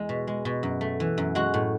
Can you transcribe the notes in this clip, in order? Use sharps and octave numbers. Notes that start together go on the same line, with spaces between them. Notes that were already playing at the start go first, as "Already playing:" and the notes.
Already playing: E2 G#3
B2
G#3
B2
F#2
A3
E3
F#2
G#3 F#4
A2